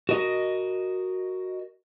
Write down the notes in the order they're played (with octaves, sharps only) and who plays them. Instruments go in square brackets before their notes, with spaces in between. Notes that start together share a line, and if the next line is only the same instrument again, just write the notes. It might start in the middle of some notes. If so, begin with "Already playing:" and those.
[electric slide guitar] F#4 A#4 D#5